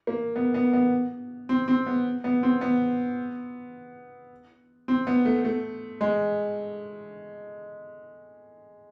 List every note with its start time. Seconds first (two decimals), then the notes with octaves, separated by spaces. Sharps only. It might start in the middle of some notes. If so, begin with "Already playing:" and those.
0.07 A#3
0.36 B3
0.54 B3
0.73 B3
1.49 C4
1.68 C4
1.87 B3
2.24 B3
2.43 C4
2.61 B3
4.88 C4
5.07 B3
5.25 A3
5.45 A3
6.01 G#3